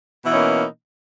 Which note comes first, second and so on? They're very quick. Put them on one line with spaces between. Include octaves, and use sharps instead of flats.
B2 E3 D#4 C#4 A#3